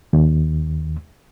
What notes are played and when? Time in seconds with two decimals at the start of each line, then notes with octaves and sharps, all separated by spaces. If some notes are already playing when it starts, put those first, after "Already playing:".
0.13 D#2